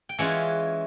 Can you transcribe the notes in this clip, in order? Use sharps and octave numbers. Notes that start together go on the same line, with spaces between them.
G5
E3 G#3 C#4 F4 F#5